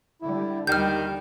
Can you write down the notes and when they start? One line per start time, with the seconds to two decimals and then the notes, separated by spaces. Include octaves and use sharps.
0.22 D3 G3 E4
0.67 D#2 D3 D#3 G3 G4 F6 G6